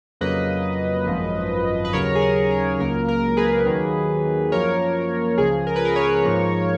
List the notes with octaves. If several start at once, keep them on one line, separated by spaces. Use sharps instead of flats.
F2 C#3 F#3 A#3 B4 D#5
G#1 F#2 F3
B4
D#2 C#3 F#3 A#4 C#5
G#4
A#4
A#4
C#2 C#3 F#3 A#3 A#4
A#4
G#4 B4
D#2 D#3 F#3 A#3
F#2 F3 A#3 A#4 C#5
C#2 C#3 F3 G#4
A#4
B4
A#4
A#4 C#5
G#2 F3 A#3